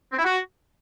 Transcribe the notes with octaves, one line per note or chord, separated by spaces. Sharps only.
C4
E4
F#4